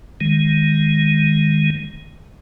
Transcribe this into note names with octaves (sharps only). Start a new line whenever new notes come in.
D#3 G#3